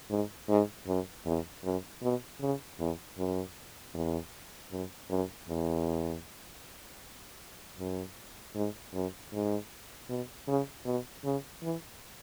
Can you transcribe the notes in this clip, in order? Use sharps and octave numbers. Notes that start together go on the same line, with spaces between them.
G#2
G#2
F#2
E2
F#2
B2
C#3
E2
F#2
E2
F#2
F#2
E2
F#2
G#2
F#2
G#2
B2
C#3
B2
C#3
E3